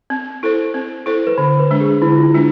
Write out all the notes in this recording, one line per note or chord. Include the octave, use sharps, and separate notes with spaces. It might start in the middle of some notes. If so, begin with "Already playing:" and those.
C4
E4 A4 C5
C4
E4 A4 C5
B4
D3 C5
B4
G#3 D4
G#4
D3 E4
F4
E4
G#3 D4